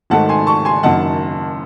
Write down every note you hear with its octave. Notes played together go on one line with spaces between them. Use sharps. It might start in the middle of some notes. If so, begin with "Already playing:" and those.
G#1 G#2 D#3 A3 F#5 A5
G#5 C6
A5 C#6
G#5 C6
F#1 F#2 D#3 F#5 A5